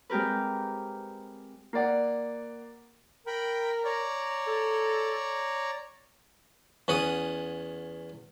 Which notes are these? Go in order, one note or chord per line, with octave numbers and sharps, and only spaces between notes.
G#3 C4 G4 A#4 B4
A#3 D5 F#5
A#4 G5 B5
C#5 D5 A#5
A4
E2 C#4 F#5 D#6